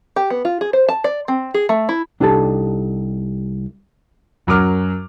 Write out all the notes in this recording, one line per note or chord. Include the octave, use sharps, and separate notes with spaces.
G4
B3
F4
G#4
C5
A5
D5
C4
G#4
A3
E4
C2 D4 D#4 G4 A4 A5
F#2 F#3 A#4 D6 F6